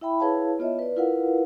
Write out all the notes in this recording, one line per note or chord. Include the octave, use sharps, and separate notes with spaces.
E4 E5 G5 B5
E4 G#4 B4 C#5 F5 A5
B3 F4 C#5 D#5 E5
B4 D5
E4 F4 A#4 B4 F5 F#5